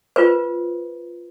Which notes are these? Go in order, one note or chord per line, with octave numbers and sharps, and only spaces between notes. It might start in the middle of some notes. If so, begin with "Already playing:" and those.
F4 B4 C5